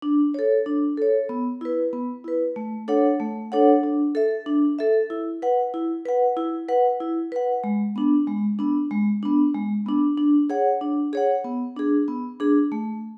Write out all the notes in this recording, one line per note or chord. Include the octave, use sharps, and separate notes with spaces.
D4
A4 C#5
D4
A4 C#5
B3
E4 B4
B3
E4 B4
A3
D4 A4 C#5 F#5
A3
D4 A4 C#5 F#5
D4
A4 E5
D4
A4 E5
E4
B4 F#5
E4
B4 F#5
E4
B4 F#5
E4
B4 F#5
G#3
B3 D4
G#3
B3 D4
G#3
B3 D4
G#3
B3 D4
D4
G#4 C#5 F#5
D4
G#4 C#5 F#5
B3
D4 G#4
B3
D4 G#4
A3